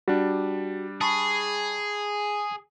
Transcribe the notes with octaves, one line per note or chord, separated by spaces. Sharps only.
G3 D4 F#4
G#4 A5 B5 C#6